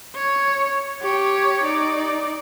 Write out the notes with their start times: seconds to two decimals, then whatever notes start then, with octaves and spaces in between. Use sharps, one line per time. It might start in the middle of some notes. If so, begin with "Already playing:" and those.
0.15 C#5
1.01 G4 C#5
1.64 D#4 D5